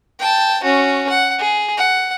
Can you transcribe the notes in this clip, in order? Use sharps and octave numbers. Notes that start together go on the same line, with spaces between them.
G5 A5
C#4 F#4
F#5
G#4
F#5